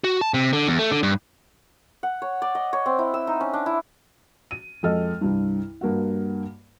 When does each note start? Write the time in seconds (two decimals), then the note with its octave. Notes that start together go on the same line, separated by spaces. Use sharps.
0.04 F#4
0.21 A5
0.34 C3
0.53 D3
0.68 E2
0.79 A3
0.92 D3
1.03 G2
2.03 F#5
2.22 C#5
2.42 D5
2.55 D#5
2.73 C#5
2.86 C4
2.99 E4
3.14 E6
3.27 D#4
3.40 C#4
3.53 D4
3.66 E4
4.51 D#7
4.83 F2 G#3 A4 D#5 F6
5.21 C2 G2
5.81 G2 A#3 F#4 F#5